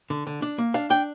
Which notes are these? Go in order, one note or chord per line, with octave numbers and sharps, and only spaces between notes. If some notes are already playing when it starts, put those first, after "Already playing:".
D3
D3
D4
A#3
D4 F5
D4 G5